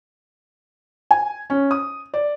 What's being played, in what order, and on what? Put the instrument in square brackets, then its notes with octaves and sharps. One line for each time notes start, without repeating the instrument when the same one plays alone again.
[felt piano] G#5
C#4
D#6
D5